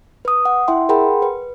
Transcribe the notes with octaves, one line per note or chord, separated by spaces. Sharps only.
B4 D#6
F#5
E4 E5 G5 C6
G#4 A#4 F#5 G5 B5 C6
B4